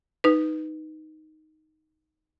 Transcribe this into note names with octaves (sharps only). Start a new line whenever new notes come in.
D#4 B4